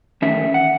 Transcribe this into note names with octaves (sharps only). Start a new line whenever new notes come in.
E2 D#3 A3 C#4 E5
F#5